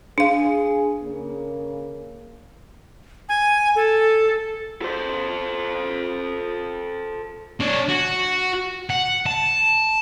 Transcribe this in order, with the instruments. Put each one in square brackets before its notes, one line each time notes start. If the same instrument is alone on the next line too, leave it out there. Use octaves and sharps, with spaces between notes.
[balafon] D4 F5 [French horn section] G#4
[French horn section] C#3 A#3
[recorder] G#5
A4
[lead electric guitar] A4 C5
[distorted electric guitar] D4 C#5
F#4
F#5
A5